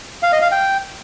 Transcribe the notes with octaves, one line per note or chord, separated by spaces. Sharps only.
F5
D#5
F5
G5